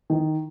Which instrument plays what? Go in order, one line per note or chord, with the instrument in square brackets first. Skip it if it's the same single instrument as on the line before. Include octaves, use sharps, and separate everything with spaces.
[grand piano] D#3